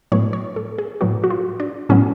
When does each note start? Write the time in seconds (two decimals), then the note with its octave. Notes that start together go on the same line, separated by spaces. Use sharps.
0.12 A2 F#3 B3 C#5
0.33 C#5
0.56 A4
0.78 G#4
1.01 A2 F#3 B3 F#4
1.24 F#4
1.30 F4
1.60 D4
1.89 A2 F#3 B3 C#4